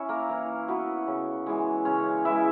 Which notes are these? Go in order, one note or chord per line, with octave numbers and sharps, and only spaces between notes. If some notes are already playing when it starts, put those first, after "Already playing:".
Already playing: C#4 E4 C#5 E5
A#3 A#4
E3
B3 E4 F#4
C#3
E3 G#3
C#3 C#4 C#5
E3 G#3 E4 E5